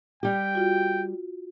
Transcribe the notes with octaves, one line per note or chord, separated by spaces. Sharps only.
G3 G4 G5
F4 F#4